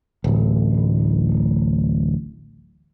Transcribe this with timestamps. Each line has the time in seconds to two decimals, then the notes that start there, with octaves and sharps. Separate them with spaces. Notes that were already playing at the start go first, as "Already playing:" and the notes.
0.24 D1 A1